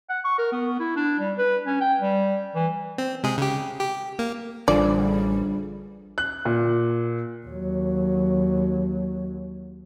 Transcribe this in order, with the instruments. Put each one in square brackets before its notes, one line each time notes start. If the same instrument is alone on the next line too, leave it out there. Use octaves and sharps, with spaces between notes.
[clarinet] F#5
C#6
A#4
B3
E4
D4
G3
B4
C#4
G5
G3
E3
[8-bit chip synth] C4
C3 G#3 G#4
C#3 G4
G4
A#3
[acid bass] A1 [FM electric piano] D3 F3 G#4 [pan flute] G3 [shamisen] D5
[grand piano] F#6
A#2
[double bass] D#2 F#3